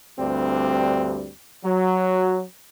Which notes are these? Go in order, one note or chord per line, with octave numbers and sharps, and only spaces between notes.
D2 G2 G3 C4
F#3